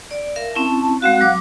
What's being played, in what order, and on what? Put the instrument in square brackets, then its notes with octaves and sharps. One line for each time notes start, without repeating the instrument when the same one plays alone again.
[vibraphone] D5
A#4 E5 F5
[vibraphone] C4 C#4 E4 [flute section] A5
[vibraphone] G#3 C4 F#4 [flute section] F5 F#5 F#6
[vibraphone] F#3 D6